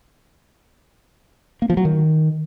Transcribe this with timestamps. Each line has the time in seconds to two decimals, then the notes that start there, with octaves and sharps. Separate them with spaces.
1.62 A#3
1.70 F3
1.77 F#3
1.85 D#3